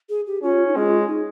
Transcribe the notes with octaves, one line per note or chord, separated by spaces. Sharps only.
G#4
G4
C#4 F4
D#4
G#3 F4
D#4